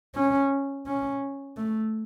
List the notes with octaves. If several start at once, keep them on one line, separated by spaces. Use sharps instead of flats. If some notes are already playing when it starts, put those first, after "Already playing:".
C#4
C#4
A3